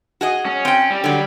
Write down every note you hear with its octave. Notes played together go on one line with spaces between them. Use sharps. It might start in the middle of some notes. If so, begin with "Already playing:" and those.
F#4 G#4 D#5
C#4
C4 G5
G3
D3 F#3